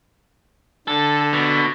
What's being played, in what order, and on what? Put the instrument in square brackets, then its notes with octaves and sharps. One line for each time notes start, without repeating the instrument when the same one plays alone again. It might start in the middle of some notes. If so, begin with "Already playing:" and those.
[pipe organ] D3 [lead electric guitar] A4
[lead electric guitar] B2